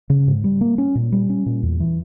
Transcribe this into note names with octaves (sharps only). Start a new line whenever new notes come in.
C#3
G#2
G3
A#3
C#4
A#2
G3
C#4
A#2
E2
E3